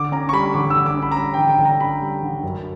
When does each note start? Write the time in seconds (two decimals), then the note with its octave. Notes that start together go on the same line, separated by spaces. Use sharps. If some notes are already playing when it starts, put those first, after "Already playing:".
Already playing: D3 D6
0.12 C#4 A#5
0.29 C#6
0.33 G3 B5
0.54 D3 D6
0.70 E6
0.76 D3
0.86 D6
0.97 C#4
1.02 B5
1.11 A#5
1.17 G3 B5
1.34 D3 G5
1.49 G5
1.59 D3
1.65 A#5
1.80 C#4 B5
2.01 G3
2.23 D3
2.43 F#2